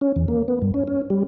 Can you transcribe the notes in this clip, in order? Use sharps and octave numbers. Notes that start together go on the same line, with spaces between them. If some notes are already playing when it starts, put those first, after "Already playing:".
C#4
E2
A#3
B3
G2
C#4
C#4
G3